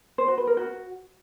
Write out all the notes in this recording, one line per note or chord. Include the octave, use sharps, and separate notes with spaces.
C5
F#4
B4
A#4
F#4